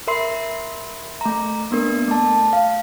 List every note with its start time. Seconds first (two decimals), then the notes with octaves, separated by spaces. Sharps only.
0.07 A#4 E5 B5 C6 C7
1.21 A3 A#5
1.71 A#3 B3 D4 A#4
2.08 A3 A5
2.53 F5